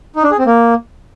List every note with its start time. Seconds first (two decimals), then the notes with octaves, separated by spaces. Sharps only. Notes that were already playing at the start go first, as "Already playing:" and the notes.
0.16 D#4
0.24 D4
0.31 G#4
0.39 C4
0.46 A#3